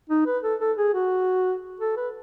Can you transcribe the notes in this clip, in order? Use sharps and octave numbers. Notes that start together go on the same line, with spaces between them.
D#4
B4
A4
A4
G#4
F#4
A4
B4